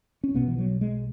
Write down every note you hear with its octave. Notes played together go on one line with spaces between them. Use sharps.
C#4
B1 B2 B3
E3
F#3
G#3